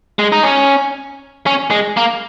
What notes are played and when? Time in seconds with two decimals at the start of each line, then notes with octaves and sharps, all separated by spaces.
0.19 G#3
0.32 D#4
0.43 C#4
1.46 C#4
1.71 G#3
1.97 A#3